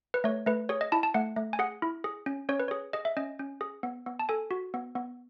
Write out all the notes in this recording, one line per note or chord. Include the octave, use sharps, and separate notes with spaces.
B4
A3 C#5
A3 B4
G#4 C#5
D#5
E4 A5
A5
A3 F#5
A3
G#5
G#4 F#5
E4
G#4
C#4
C#4 C#5
B4
G#4 C#5
G#4 D#5
E5
C#4 D#5
C#4
G#4
B3
B3
A5
A4 G#5
F#4
B3
B3